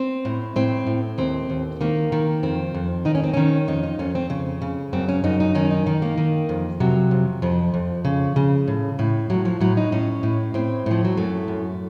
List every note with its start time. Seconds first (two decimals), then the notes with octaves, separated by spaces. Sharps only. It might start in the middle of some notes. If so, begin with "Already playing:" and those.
Already playing: C4
0.25 A2
0.56 A2 C4
0.87 A2
1.18 D#2 C4
1.50 D#2
1.81 D#3 A#3
2.12 D#3
2.43 F2 C4
2.75 F2
3.05 D#3 D#4
3.15 C#4
3.24 C4
3.34 D#3 C#4
3.68 F2 D#4
3.83 D#4
3.99 F2 C#4
4.15 C4
4.30 C#3
4.62 C#3
4.93 F#2 C4
5.09 C#4
5.24 F#2 D#4
5.40 D#4
5.55 D#3 C#4
5.71 D#4
5.86 D#3
6.02 A#3
6.18 D#3
6.49 F2
6.80 C3 F#3
7.11 F2
7.42 F2 F3
7.74 F2
8.05 C#3
8.36 C#3
8.68 A2
8.99 A2
9.30 A2 F#3
9.45 F3
9.61 A2 F#3
9.77 D#4
9.92 A2 C#4
10.23 A2
10.54 A2 C4
10.86 A2 F3
11.05 F#3
11.17 F#2 A3
11.48 F#2